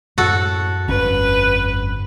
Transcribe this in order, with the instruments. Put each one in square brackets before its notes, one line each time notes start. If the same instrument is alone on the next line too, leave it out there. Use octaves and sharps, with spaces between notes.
[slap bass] F#2 A2 [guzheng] F#4 A4
[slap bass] G1 F2 C#4 [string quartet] B4